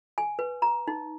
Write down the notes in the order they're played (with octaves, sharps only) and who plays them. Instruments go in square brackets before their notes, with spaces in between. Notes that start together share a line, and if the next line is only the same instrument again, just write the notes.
[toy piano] G#5
B4
A#5
D#4